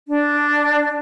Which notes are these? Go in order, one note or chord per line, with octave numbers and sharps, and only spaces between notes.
D4